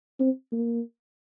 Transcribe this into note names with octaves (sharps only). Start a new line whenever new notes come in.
C4
A#3